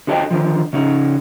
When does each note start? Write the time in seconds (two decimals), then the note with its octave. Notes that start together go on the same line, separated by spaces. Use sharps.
0.07 D3 F#4 A4 B4 D#5 G5
0.31 D3 D#3 F3
0.73 C#3 C#4 D#4